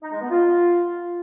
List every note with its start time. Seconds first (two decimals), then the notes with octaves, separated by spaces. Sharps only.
0.03 D#4
0.12 G#3
0.21 B3
0.30 F4